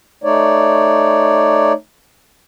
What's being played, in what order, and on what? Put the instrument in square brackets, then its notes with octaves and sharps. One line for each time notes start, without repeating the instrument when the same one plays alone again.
[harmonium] A3 D#4 C#5 D5